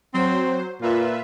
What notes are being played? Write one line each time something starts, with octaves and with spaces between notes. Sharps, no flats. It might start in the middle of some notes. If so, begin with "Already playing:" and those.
F#3 C4 C5
A#2 F4 B4 E5